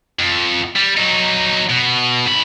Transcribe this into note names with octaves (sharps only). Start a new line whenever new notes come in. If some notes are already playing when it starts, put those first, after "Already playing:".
F2
G3
F#3 D#4
B2
G#2 B5